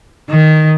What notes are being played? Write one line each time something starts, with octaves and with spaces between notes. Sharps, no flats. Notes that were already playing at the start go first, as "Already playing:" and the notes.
D#3